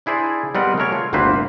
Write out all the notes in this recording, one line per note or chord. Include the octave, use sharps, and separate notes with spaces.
D4 E4 G#4 C5 D5
G3 B3 C4 A#4 D#5 F#5
A3 G#4 A#4 C#5
F4
G1 D2 A#3 C4 B4 C5